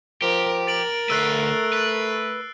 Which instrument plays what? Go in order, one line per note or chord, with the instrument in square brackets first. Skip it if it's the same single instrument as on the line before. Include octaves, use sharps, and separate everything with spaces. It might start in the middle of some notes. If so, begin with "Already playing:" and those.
[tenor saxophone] F3 [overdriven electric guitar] G4 [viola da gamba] A#4
[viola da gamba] A#4 [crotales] A6 D7 F#7
[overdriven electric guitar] D2 B4 [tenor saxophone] A3 [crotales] E6 F#6 C7
[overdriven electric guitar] B4